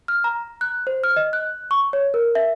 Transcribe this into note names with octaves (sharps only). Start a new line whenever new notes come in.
F6
A#5
F#6
C5
F6
D#5
F#6
C#6
C#5
A#4
E5